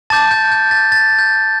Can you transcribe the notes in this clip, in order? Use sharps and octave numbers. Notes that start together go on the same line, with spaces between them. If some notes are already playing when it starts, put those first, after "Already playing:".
A5 D6 G6 A6
G6
G6
A6
A6
G6